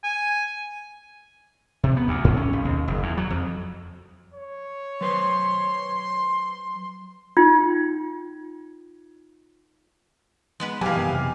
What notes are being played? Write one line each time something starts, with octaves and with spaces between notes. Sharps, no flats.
G#5
C3
B3
D2
G#2
C#4
B1
D#2
F#1
E2
F#3
F2
C#5
F#3 B4 C5 C6
D#4 F4 G5
G#3 B3 B4
G2 B2 E3 F#3 G4 F5 G#5
F#2 D#3 B3
F2 C3